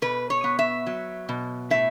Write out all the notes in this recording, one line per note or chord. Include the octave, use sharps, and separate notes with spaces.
B2 B4
C#5
B3
E5
F#3
B2
A2 E5